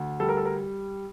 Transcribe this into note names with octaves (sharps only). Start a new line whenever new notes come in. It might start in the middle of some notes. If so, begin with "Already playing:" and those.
Already playing: D2
G3 A4
A#4
A4
A#4